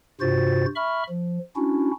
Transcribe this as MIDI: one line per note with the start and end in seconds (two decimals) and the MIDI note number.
0.21 0.65 43
0.21 0.65 48
0.21 0.65 65
0.21 0.65 66
0.21 0.65 72
0.21 0.65 93
0.76 1.03 76
0.76 1.03 83
0.76 1.03 85
0.76 1.03 89
1.10 1.39 53
1.56 1.91 61
1.56 1.91 62
1.56 1.91 64
1.56 1.91 66